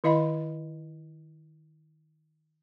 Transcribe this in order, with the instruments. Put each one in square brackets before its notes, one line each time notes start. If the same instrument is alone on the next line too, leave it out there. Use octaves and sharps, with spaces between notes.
[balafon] D#3 E4 D#5 F5 B5